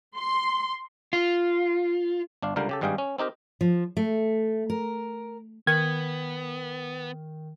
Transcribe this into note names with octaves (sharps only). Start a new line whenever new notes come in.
C6
F4
G1 D4 F5
C#2 D3 G3 A#4 F5 G5
C#3 G4 A4
G#1 G2 G3 G#4 F5 G5
C#4
C4 D#4 G4 A#4
F3
A3
A#4
D#3 B3 G#6